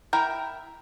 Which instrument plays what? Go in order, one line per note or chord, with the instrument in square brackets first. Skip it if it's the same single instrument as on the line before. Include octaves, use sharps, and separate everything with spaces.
[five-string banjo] E4 A#4 G5